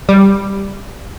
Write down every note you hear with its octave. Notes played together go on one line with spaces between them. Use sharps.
G3